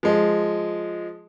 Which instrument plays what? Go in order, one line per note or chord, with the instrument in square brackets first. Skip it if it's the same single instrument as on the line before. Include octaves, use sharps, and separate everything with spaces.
[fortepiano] F3 G#3